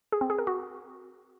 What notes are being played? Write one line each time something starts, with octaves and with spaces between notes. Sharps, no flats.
G#4
C4
G#4
A#4
F#4